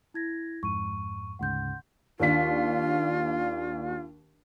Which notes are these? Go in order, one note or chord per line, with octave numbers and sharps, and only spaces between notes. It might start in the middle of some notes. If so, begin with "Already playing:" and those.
E4 G#6 A#6
F2 G#2 C#6 D#7
D2 G#2 C#3 F#5 C6 G6
D#2 D4 F4 B6